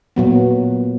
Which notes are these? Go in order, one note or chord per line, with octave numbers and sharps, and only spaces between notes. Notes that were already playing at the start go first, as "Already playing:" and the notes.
A#2 F#3 B3